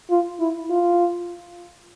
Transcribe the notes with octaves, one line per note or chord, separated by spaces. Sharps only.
F4
E4
F4